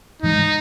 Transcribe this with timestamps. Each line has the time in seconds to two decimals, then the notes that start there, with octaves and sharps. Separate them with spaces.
0.22 G#2 E3 G#3 D#4